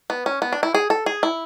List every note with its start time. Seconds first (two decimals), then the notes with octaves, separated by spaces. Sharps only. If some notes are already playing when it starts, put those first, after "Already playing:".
0.10 B3
0.26 C#4
0.42 B3
0.53 D4
0.63 E4
0.75 G#4
0.90 A4
1.06 G#4
1.23 E4